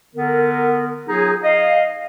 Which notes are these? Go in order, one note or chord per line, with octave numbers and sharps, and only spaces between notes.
D3 B3 A#4
F#3 D#4 F4 G#4
D#5 F5